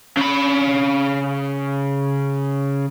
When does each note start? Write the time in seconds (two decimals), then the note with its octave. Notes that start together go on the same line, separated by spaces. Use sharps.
0.17 C#3 B5